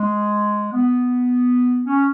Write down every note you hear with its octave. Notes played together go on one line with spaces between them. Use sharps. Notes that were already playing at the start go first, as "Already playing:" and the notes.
Already playing: G#3
B3
C#4